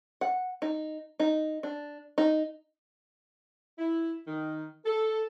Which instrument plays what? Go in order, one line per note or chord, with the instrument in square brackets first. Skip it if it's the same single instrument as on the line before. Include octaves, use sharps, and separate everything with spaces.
[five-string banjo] F#5
D#4
D#4
D4
D#4
[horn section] E4
D#3
A4